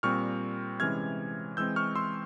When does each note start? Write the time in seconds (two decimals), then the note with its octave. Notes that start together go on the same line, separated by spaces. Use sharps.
0.03 A#2 G3 C4 C#6 F6
0.80 C3 E3 G#3 C#4 F6 G#6
1.57 E3 G#3 C4 E6 G6
1.76 C#6 F6
1.95 C6 E6